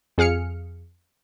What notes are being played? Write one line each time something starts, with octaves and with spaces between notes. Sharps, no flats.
F2 G#4 F5 F6 C#7